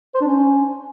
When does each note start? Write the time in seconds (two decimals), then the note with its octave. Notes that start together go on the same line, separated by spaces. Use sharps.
0.15 C5
0.21 D4
0.27 C#4